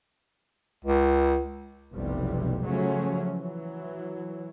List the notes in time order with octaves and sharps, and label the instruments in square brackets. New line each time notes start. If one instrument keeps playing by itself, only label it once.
[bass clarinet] C#2
[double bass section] F1 B1 C3 E3 G3
C#3 F3 F#3 A3 C#4
E3 F#3